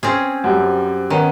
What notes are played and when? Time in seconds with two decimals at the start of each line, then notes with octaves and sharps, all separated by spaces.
0.03 C4 C#4 G#4
0.44 F#2 G3
1.10 D#3 B3 C#4